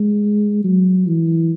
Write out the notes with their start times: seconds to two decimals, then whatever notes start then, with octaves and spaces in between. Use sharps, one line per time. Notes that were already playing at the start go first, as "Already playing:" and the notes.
Already playing: G#3
0.64 F#3
1.07 E3